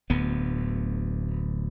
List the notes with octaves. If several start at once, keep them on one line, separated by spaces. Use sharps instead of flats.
D1 D2 B3